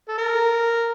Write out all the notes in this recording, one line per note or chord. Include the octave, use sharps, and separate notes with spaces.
A4
A#4